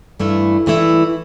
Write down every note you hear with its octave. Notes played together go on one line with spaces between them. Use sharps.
G2 E3 A3 E4
G2 E3 A3 E4